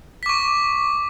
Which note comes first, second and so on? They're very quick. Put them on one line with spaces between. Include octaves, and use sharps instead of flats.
B6 D6 C#6